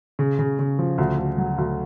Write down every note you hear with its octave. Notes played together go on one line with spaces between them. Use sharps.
C#3
C#3
C#3
F3
D2
D2
F#3
D2